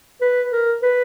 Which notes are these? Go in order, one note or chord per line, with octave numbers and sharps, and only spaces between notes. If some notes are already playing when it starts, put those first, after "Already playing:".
B4
A#4
B4